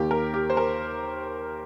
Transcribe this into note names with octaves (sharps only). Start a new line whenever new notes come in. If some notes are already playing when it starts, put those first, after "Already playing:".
Already playing: D#2 D#3 A#3 G4
A#4
G4
C5
A#4